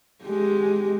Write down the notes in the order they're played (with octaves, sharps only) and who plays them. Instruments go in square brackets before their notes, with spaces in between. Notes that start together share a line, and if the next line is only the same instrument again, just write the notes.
[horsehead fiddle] G#3 G4